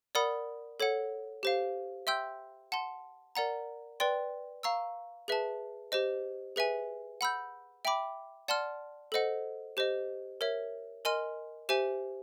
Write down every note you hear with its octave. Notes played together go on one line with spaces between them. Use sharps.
A#4 D5 F#5 B5 D#6
A4 C#5 F#5
G4 C5 F5
E5 G5 C6 E6 G6
F#5 A5 C6
A#4 D5 F#5 A#5
B4 D5 G5 C6
F5 A#5 C#6 E6
G#4 B4 E5 A5
G4 C5 D#5
G#4 B4 E5 G#5
F#5 B5 E6 G6
E5 G5 B5 D6
D5 F#5 A5 C6 F6
A4 C5 D#5 F#5
G4 C5 D#5
A#4 C#5 E5
A#4 D#5 G#5 C6 F6
G4 C5 E5 G#5